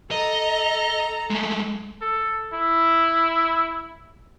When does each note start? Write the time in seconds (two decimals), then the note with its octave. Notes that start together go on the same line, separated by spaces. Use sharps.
0.11 A4 D#5 A#5
1.30 G#3 A3
2.01 A4
2.53 E4